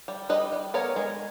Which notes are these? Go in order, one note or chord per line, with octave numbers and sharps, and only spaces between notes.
G3
G3 B4 D#5
G3
B3 A#4 C#5
G#3